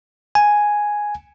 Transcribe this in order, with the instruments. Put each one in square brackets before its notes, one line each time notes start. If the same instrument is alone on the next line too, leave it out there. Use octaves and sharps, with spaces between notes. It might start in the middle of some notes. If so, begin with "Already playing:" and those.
[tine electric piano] G#5